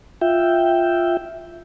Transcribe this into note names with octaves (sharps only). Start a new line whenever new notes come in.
F4 E5 G5